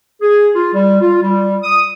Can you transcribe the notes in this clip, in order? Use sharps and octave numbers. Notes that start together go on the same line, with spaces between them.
G#4
F4
G3
F4
G3
D#6